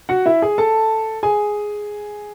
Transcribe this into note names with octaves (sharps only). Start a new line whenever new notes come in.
F#4 F#5
E4 E5
G#4 G#5
A4 A5
G#4 G#5